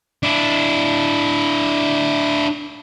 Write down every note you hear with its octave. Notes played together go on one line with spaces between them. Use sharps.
D4 E4